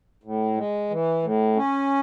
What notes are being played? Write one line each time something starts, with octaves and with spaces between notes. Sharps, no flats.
A2
G#3
E3
A2
C#4